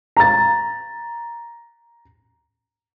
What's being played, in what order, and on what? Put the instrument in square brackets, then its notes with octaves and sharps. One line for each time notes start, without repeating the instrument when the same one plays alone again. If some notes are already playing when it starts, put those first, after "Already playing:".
[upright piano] A#5 A6